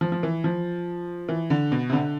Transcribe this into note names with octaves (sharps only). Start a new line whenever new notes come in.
F3
F3
E3
F3
E3
D3
B2
C3
D3